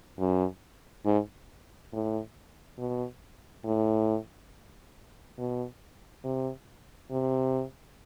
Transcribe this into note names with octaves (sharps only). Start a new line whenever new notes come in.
F#2
G#2
A2
B2
A2
B2
C3
C3